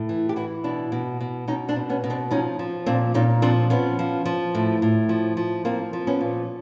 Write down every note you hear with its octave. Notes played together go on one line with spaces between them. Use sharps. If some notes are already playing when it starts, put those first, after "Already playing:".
Already playing: A2
E3
G4
E3 E4 F#4
B2 D4 E4
B2
B2
B2 C#4 D#4
C4 D4
B2
B3 C#4
B2
C4 D4
F3 C#4 D#4
F3
A#2 C4 D4
A#2 C#4 D#4
F3 C4 D4
F3 B3 C#4
F3
F3
A2
A2
F3
F3
F3 A#3 C4
F3
B3 C#4
A#2